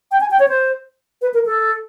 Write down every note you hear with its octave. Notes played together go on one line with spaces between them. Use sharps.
G5
G#5
G5
C#5
C5
B4
A#4
A4